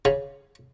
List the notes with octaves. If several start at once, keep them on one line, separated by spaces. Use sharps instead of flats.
C#3